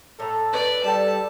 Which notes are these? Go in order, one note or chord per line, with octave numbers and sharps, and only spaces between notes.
A2 A4 A#5
B4 D5
G3 G4 A4 D5 A5